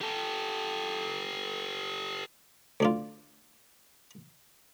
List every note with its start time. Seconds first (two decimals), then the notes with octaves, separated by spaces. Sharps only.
0.01 G4 A4
2.80 D2 D4 F4